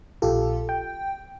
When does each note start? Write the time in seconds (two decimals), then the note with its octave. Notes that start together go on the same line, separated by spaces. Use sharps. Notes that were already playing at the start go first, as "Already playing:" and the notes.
0.22 A#1 F4 G4 A4
0.69 G5